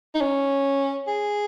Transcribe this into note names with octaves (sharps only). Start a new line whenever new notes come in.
D#4
C#4
G#4